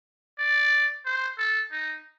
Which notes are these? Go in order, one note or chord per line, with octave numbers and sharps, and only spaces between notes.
D5
C5
A4
D#4